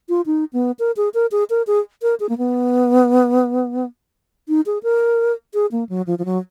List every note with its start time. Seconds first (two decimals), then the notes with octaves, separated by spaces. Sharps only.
0.09 F4
0.26 D#4
0.53 B3
0.79 A#4
0.97 G#4
1.14 A#4
1.32 G#4
1.50 A#4
1.67 G#4
2.02 A#4
2.20 G#4
2.29 A#3
2.38 B3
4.49 D#4
4.66 G#4
4.83 A#4
5.54 G#4
5.72 A#3
5.89 F#3
6.07 F3
6.19 F3
6.25 F#3